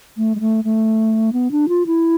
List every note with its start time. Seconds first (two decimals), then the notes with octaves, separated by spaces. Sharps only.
0.17 A3
0.35 G#3
0.40 A3
0.64 A3
1.33 B3
1.52 D4
1.69 F4
1.86 E4